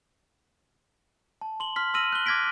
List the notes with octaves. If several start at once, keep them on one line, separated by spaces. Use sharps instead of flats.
A5
C6 F#7 G7
C6 F6 B6
C6 E6 F6 A#6 D#7 F#7
F#6 G7
D6 F6 G#6 A#6 B6 D7